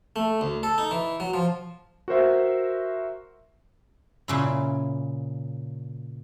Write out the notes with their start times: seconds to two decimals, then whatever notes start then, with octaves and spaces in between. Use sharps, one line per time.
0.16 A3
0.41 D2
0.63 A4
0.78 D#4
0.91 E3
1.20 F#3
1.34 F3
2.08 F#4 A#4 C5 E5
4.28 A#2 C#3 E4